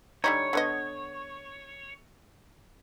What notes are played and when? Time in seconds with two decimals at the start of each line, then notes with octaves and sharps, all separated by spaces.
0.24 D3 G3 D#4 C#5
0.53 D3 B3 D#5